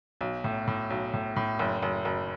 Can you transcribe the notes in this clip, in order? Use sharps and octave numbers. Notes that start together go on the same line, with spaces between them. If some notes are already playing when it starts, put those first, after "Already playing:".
B1
A2
A2
B1
A2
A2
F#1
F#1
F#1